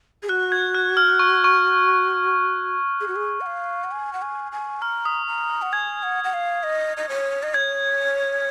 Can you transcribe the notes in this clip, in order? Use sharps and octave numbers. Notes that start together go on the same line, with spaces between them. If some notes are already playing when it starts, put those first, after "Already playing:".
G#4
F#4 F#6
G#6
F#6
F6
C#6
C#6
G#4
F#4
G#4
F#5
F5
F#5
G#5
F#5
G#5
G#5
A#5 F6
D#6
A#5
F6
F#5
G#5 G#6
F#5
F#5
F5
D#5
D#5
C#5
D#5
C#5 G#6